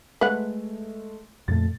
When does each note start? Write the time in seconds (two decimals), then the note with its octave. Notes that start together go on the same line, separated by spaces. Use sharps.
0.21 G#3 A3 B4 F#5
1.48 F2 A#2 A3 A6